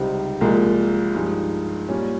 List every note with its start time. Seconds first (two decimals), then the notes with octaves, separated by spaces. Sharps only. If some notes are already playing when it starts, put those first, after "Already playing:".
Already playing: C#2 C3 G3 C4 D#4
0.41 C2 A#2 F3 G#3
1.14 G2 F3 G#3 D#4
1.89 A#2 G3 C#4